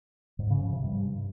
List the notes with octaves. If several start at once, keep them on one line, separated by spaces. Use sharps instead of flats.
G#2
C#3
F3
C3
G2